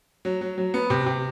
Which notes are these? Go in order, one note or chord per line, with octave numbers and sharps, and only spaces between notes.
F#3
F#3
F#3
B3
C3
C3